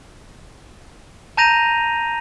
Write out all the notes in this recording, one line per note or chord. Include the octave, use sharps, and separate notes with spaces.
A5 A#5 G6 A#6 D#7 F7